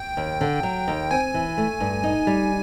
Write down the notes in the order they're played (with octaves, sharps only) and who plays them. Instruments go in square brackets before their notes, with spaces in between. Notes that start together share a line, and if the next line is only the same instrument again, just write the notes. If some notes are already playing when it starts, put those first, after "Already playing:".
Already playing: [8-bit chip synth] G5
[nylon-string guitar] D#2
D3
F#3
D#2
[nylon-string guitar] C4 [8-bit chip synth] G#5
[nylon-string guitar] E3
A3
G2
D#4
G3